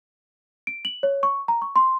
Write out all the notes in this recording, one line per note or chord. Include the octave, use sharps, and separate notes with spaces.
D7
F#7
C#5
C#6
A#5
C#6
C6